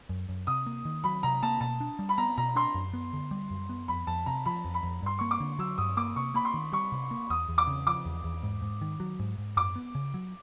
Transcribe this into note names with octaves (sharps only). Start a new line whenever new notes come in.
F#2
F#2
C3 D#6
A#3
D#3
F#3 B5
C3 A#5
A#3 A5
B2 A5
D4
G3
B5
B3 A#5
B2 A#5
D4 C6
F#2
B3
D3
G3
F#2
B3
F2 B5
F2 A5
C3 A#5
F3 B5
F2
B5
F2
G2 C6
A#3 C#6
D6
D3
F#3 E6
G2 D#6
A#3 D6
C3 C#6
A#3 B5
C6
D#3
G3 C#6
C3
A#3
E2 D#6
E2
D6
C#3
F3 D6
E2
E2
G#2
G#2
D#3
F#3
G#2
G#2
F#2 D6
B3
C#3
F#3